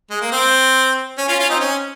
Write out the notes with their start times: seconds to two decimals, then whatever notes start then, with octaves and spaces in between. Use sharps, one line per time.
0.10 G#3
0.21 A#3
0.32 C4
1.18 C#4
1.28 C#4 F4
1.40 C#4 F4
1.50 C4 D#4
1.60 C#4